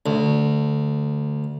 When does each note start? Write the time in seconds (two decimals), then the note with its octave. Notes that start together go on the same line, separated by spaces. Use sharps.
0.06 D2